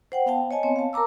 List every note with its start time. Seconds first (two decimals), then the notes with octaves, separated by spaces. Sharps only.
0.12 C5 F#5 G5
0.26 B3 F5 G5 A5
0.51 C#5 D#5 G#5 A5
0.63 B3 C4 C#5
0.76 F5 A5
0.93 A#4 A5 A#5 D6 E6